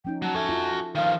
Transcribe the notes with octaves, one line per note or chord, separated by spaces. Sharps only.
F3 C#4 D#4 G5
F#3 A5
F#4 A4 E5 G#5
E4 F4
D#3 F3 F5